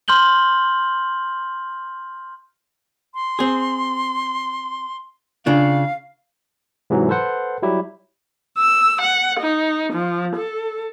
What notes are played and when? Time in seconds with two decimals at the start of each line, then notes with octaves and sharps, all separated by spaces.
0.08 C6 F6 G6 F#7 G7
3.15 C6
3.39 C4 G#4
5.46 C#3 D4 F4 F5
6.90 G#2 C3 E3 F#3
7.09 A4 B4 C5 F#5
7.62 F#3 G3 E4 G4
8.58 E6
9.01 F#5
9.39 D#4
9.94 F3
10.35 A4